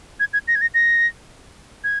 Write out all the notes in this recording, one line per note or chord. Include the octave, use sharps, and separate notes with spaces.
G#6
G#6
A#6
G#6
A#6
A#6
G#6